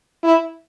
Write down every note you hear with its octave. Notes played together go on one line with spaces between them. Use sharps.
E4